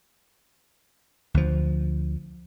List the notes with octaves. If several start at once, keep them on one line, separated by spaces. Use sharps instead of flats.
D2 F3